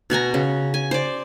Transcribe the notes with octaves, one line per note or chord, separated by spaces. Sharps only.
B2 F#4 G#5 A#5
C#3
G#5
C5 D5